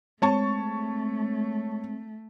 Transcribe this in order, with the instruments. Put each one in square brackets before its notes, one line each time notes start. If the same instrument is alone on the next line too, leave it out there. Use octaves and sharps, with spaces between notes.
[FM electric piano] G#3 C4 [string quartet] A3 [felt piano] C#5 A5 C#6